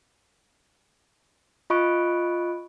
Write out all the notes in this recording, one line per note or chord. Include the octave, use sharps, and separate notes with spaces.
F4 D#5 B5 C#6 F#6 D7